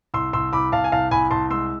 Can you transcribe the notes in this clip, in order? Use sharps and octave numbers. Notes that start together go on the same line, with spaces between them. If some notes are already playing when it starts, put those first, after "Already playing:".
C2 C6 E6
C2 C6 E6
C2 B5 D6
C2 F5 A5
G#5
C2 F5 A5
C2 G#5 B5
C2 A5 C6
G#3 C6 E6